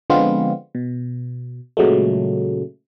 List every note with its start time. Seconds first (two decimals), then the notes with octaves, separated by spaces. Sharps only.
0.10 D3 F3 G#3 B3 C4 F4
0.75 B2
1.77 A#2 C#3 F#3 G#3 A3